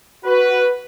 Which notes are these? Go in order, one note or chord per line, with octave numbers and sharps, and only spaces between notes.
F#4 B4